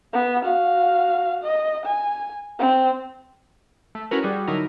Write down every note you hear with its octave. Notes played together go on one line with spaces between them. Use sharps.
B3
F#4 F5
D#5
G#5
C4
A3
C#4 E4 F#4 A#4 B4
G3 F#4 G#4
D3 F#3 D#4 E4 A#4